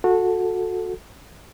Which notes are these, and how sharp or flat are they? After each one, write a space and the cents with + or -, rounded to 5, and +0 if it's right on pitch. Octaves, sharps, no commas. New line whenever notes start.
F#4 -20 A4 +0